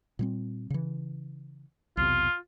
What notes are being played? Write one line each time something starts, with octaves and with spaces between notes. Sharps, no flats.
A#2 G3 C4
C#3 E3
B1 E2 C3 F4